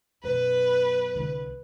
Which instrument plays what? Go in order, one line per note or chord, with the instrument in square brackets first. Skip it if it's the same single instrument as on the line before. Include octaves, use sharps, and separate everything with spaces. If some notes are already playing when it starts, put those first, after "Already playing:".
[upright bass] F#2 B2 [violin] B4
[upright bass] C2 D3